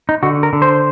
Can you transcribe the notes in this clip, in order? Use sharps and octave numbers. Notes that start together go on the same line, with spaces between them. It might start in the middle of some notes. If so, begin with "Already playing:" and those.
D#4
D3 F#4
A#4
D3
C5